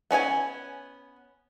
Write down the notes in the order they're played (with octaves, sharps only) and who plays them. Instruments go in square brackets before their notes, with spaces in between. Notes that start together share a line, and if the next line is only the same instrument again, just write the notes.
[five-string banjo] B3 C#4 D5 G#5